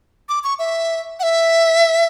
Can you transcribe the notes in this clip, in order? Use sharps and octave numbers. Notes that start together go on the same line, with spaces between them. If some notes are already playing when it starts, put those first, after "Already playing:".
D6
C#6
E5
F#5
E5